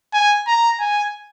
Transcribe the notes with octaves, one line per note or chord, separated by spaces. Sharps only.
G#5
A#5
G#5